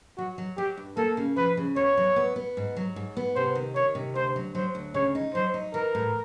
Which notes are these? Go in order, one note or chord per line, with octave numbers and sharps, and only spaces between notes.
F#3 F#4
F#3
F#3 G4
G2
A#3 A4
C#3
F3 B4
C#3
E2 C#5
F#3
B3
B3
G#2
F#3
G#2
B3
C3 C5
D#3
D#3 C#5
C3
D2 C5
F#3
F#3 C5
D2
C#3 C#5
D#4
F#3 C5
D#4
E3 A#4
A2